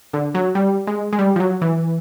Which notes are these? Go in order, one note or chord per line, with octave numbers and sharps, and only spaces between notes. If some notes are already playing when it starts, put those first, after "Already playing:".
D3
F#3
G3
G#3
G#3
G3
F3
F#3
E3